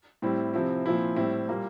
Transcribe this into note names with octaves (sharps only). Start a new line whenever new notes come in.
A2 G3 C4 E4
C3 F3 C4 E4
A#2 F3 C4 E4
A2 G3 C4 E4
A#2 G3 A#3